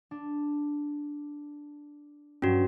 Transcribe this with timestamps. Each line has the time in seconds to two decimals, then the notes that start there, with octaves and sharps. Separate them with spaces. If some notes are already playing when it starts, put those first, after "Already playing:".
0.11 D4
2.42 G2 F#3 C#4 F#4